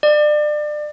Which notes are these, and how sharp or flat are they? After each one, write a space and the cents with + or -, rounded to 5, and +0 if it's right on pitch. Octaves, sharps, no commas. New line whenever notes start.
D5 +30